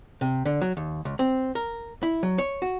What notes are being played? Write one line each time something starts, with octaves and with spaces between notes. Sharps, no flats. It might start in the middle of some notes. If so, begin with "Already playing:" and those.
C3
D3
F#3
D#2
C#2
C4
A#4
E4
F#3
C#5
F#4